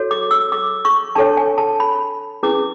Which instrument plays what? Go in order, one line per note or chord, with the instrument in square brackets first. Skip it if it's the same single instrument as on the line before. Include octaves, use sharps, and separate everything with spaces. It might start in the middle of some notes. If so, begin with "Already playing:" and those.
Already playing: [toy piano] F#4 A4 C#5
D6
E6
D6
C#6
D4 A4 C#5 A5
G#5
A5
B5
C#4 E4 G#4 B4 D6